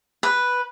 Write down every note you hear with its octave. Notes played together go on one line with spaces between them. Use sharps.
B4